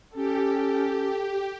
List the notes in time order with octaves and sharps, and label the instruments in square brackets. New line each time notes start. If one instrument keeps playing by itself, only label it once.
[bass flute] C#4 [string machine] G4 [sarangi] A4